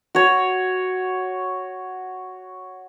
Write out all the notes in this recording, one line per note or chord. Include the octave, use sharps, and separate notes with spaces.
F#4 C#5